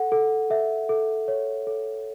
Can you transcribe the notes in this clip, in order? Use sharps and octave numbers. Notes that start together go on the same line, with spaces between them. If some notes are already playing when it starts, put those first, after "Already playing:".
Already playing: A4 F#5
A4
A4 E5
A4
C#5
A4